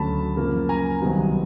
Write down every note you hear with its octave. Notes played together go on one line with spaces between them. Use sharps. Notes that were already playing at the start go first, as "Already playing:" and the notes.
Already playing: D2 D3 F#3 A3 C#4 A5 B5
F#2 C#3 F3 A#3
G#5 A#5
C2 C3 D#3 F#3 B3